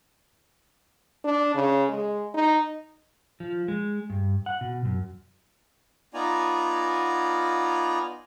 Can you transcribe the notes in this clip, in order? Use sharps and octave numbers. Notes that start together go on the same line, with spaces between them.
D4
C#3
G#3
D#4
F3
G#3
G2
F#5
B2
F#2
B3 D#4 F4 D5 G#5 A#5